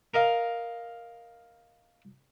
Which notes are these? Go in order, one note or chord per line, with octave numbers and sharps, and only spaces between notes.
A#4 D#5 F5